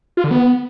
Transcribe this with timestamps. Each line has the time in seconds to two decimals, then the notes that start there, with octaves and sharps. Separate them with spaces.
0.17 F4
0.24 D3
0.31 B3